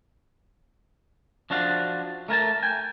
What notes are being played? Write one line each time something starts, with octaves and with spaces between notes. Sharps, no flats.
F3 D4 F#4 F5
A3 A#4 G#5 A5
G5 G#5